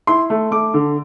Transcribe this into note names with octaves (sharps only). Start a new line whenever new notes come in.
E4 C6
A3
A3 D6
D3